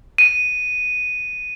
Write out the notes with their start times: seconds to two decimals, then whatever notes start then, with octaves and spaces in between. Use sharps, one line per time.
0.18 D#7